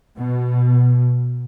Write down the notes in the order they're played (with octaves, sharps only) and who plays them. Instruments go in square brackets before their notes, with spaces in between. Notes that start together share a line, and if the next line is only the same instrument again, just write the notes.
[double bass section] B2